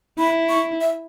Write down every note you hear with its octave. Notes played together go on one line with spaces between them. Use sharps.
E4 B5
C#6
E5